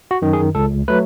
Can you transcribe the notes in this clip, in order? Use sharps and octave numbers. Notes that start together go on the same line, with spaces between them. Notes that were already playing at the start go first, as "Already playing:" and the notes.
F#4
F#2 D#3
G#4
C#2 A4
F#3 A3 B4